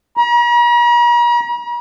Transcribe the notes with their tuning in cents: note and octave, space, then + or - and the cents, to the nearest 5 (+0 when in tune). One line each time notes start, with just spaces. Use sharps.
A#5 +45